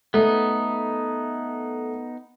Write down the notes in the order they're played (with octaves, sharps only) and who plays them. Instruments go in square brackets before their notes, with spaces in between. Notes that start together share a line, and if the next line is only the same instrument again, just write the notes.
[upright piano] A3 [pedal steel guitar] B3 D#4